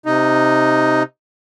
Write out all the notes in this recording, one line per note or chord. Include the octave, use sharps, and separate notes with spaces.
C3 D#4